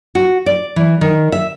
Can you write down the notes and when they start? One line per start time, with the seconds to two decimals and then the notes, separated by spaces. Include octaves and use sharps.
0.15 F#4
0.46 D5
0.76 E3
1.01 D#3
1.32 E5